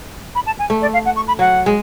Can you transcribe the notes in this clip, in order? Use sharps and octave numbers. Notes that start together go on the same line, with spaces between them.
B5
A5
G#5
A3
D5
F5
F#5
C#6
B5
F#3 F#5
G#3